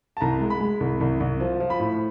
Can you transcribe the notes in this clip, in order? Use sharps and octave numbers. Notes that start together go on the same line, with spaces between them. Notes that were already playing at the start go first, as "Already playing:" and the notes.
A5
C2 A#5
G#3
B5
G#3
C2
C2
C2
F3
F3
B5
A2